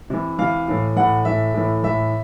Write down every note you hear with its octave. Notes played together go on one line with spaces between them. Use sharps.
C3 E3
C3 E3 F5
A2 E3
A2 E3 F#5
A2 E3 E5
A2 E3
A2 E3 E5